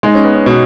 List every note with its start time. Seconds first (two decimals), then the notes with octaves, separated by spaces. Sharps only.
0.03 G#3 D#4
0.14 C#4
0.24 B3
0.35 C#4
0.46 B2